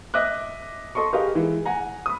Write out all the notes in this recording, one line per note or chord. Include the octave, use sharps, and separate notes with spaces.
D#5 E5 D6 F#6
A4 D#5 C6 C#6
G4 G#4 A#4 B4 D#5 F5
E3 G#3
F#5 G#5 A#5
B5 D#6